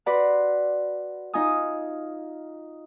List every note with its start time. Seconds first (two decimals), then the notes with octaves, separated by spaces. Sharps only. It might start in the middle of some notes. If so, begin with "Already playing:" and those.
0.06 F#4 B4 D5 F#5 B5 C6
1.34 D#4 F4 G#5 D#6